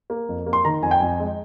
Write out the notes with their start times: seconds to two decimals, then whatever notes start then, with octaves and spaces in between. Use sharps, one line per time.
0.10 A#3
0.29 F2
0.46 A#3
0.53 C6
0.65 D#3 A#5
0.82 F2 G#5
0.91 G5
1.00 F2 G#5
1.20 G#3